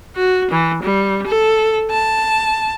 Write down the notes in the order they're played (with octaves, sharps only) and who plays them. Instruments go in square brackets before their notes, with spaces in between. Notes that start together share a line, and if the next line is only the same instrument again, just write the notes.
[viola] F#4
E3
G3
A4
A5